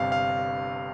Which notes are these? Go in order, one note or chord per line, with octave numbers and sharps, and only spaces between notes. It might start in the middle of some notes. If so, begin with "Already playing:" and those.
Already playing: G1 G2 C3 F5
F5